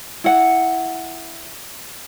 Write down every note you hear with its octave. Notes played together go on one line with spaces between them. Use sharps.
E4 F#5